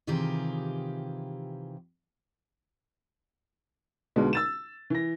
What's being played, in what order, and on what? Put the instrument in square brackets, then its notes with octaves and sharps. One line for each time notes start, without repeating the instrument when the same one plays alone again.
[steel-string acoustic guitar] C3 D#3 E3 F4 G4 G#4
[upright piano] B1 B2 D3 G#3
E6 A6 E7
E3 A#6